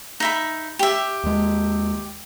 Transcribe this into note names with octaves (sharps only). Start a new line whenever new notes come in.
D#4 E5 B5
G4 E5
D#2 G#3